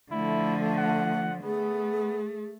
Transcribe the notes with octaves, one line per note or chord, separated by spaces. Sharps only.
D3 F3 A3 E4
F#5
A3 B3 G#4